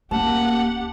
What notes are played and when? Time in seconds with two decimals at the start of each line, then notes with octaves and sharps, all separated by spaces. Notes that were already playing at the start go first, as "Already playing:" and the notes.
0.11 D1 A#3 C#4 G4 F#5 A5